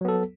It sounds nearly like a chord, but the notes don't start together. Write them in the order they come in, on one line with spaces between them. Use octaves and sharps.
F#3 B3 A4